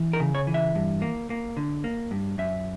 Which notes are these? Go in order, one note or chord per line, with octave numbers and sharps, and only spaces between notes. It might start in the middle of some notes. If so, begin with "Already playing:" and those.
Already playing: E3
A#4
C#3
C#5
E3
E5
G2
A#3
A#3
D3
A#3
G2
F#2 E5